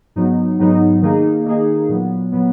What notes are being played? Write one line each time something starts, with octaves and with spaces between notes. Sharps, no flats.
G#2 F#3 B3 D#4
G#2 F#3 B3 D#4
D#3 A#3 D#4 G#4
D#3 A#3 D#4 G#4
A#2 F#3 B3
A#2 F#3 B3